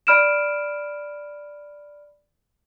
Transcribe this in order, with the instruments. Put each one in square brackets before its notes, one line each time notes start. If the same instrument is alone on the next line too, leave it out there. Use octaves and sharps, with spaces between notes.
[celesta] D5 B5 F6 D7 E7